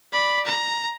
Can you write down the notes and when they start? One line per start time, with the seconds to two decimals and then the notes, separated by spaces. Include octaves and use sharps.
0.12 D5 B5
0.45 A#5